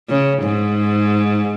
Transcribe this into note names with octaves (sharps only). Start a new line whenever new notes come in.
C#3
G#2